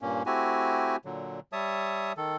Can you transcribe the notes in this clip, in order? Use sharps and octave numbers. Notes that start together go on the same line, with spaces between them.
G2 A#2 A#3 C#4
A3 C4 E4 F#4 G4 G#5
A#2 D3 F#3
G3 C#5 E5 A5 D#6
D#3 A4